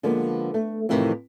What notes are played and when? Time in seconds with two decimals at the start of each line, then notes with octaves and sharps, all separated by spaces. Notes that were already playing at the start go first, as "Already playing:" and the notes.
0.03 D3 F3 G#3 A#3 B3
0.54 A3
0.89 F2 A2 C3 D#3 E3